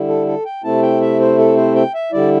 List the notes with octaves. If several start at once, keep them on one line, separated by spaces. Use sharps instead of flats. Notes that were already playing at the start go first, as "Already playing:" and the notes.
Already playing: D3 G3 E4
A4
A4
G5
C3 A3 C4 E4 A5
G5
E5
C5
A4
C5
G5
E5
D3 G3 E4 D5